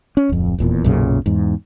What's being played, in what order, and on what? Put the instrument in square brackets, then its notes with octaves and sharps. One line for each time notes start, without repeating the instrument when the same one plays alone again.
[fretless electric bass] C#4
D1 F2
D#1 E2 A#2
B1 F#2 A#2 C#3
E2 G#2